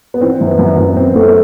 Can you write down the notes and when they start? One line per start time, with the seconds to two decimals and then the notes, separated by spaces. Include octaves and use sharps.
0.14 B3
0.21 E3 C4
0.41 F#2
0.47 B3
0.59 F#2
0.72 B3
0.77 F#2
0.90 B3
0.96 F#2 C4
1.15 F#2 A3
1.29 A3